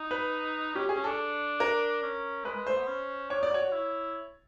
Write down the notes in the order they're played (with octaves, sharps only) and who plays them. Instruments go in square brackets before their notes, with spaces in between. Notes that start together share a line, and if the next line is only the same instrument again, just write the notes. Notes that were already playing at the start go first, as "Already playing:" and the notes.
Already playing: [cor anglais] D#4
[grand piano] B4
[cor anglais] C#4 [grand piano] G4
[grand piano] G#4
[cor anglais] C#4
[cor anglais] D4 [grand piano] A4
[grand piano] A#4
[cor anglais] C#4
[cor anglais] G#3 [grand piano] B4
[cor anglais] G#3
[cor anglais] A3 [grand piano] C5
[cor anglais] B3
C#4
[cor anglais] D4 [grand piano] C#5
[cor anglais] D#4 [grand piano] D5
[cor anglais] F#4
[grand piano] C#5
[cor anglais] F#4
E4